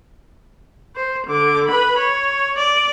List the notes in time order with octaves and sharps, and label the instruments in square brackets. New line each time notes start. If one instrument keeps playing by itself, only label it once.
[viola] C5
D3 D6
B4 B5
C#5
D5